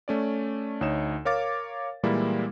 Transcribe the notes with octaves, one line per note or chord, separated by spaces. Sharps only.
A3 C#4 D5
D2 D#4 C#5 D#5 E7
A#4 C#5 F5 D6 A6
A#2 E3 G3 G#3 A#3 E4